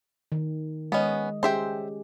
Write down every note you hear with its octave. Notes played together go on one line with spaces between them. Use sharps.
D#3
G#3 B3 C#4 D#5
C#4 G4 G#4 C5 E5 G5